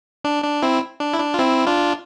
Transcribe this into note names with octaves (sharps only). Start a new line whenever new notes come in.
D4
D4
C4 E4
D4
E4
D4
F4
C4 E4
D4 F4